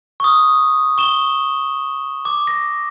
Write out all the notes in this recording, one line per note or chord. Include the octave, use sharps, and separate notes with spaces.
C#6 D#6
C#6 E7 G7
D6
A#6